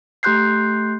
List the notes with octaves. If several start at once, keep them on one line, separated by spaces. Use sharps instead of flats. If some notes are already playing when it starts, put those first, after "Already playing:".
A3 G4 C6 F#6 G6 C7